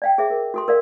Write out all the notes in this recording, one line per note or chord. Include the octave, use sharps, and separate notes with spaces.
D5 F5 G5
G#4 C5 E5 D6
A#4
F#4 A4 C6
A#4 D5 F5